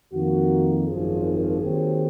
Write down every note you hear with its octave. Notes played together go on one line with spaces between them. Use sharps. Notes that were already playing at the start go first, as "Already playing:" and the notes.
F2 D#3 A#3 F#4
G#1 F#2 F3 G#4
D#2 D#3 F#3 C4